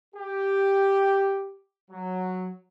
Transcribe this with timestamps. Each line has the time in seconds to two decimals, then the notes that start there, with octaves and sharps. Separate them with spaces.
0.15 G4
1.90 F#3